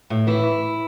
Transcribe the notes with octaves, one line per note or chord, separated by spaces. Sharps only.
A2
E3 E4